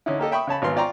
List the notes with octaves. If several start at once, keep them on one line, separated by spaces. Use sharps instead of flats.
D3 C#4 D#4 E4
A#3 G4 A4 D#5
E5 G5 B5 C#6 D#6
C#3 C#5 A5 B5
G#1 F#3 B3 F5 C6 F6
F4 D5 G5 A#5 C6 C#6